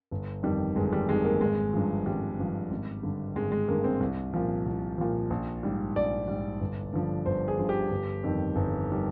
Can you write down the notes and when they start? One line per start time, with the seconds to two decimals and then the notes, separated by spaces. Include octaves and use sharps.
0.11 G1
0.43 F2 D#3 G3
0.76 G1 G#3
0.93 G3
1.09 F2 D#3 G3 G#3
1.24 A#3
1.41 G#1 G#3
1.73 G2 F3
2.06 G#1 G3
2.39 G2 F3
2.71 G#1
3.03 G2 D3
3.35 G#1 G#3
3.52 G#3
3.68 G2 D3 A#3
3.84 C4
4.00 C2
4.34 A#2 F3
4.66 C2
4.98 A#2 F3
5.30 A#1
5.63 G#2 G3
5.96 A#1 D5
6.28 G#2 G3
6.61 G1
6.93 G2 D3 F3
7.26 G1 C5
7.48 G#4
7.58 G2 D3 F3
7.69 G4
7.91 G1
8.23 F2 D#3 G3
8.56 G1
8.90 D#3 G3